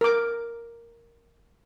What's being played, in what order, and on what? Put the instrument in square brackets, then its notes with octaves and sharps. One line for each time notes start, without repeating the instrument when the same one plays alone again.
[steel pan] A#4 D6